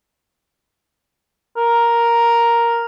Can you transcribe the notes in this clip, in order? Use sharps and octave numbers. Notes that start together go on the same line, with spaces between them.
A#4